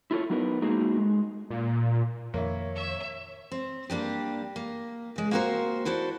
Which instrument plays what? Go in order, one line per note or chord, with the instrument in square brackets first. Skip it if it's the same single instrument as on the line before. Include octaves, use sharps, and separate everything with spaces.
[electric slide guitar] E4 F4 A4 C#5
F#3 B3 D#4 G4 A#4 B4
G#3 A#3 D#4 F#4 G#4 A4
G#3
[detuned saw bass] A#2
[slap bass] F2 D#3 [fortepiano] A#3 E4 [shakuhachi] C#5
[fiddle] E5
[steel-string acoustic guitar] C4
G3 A#3 D4 G4
A#3
C#3 G#3
A#3 C4 F#4 A4 A#4 C5
E4 F#4 A4 C5 D5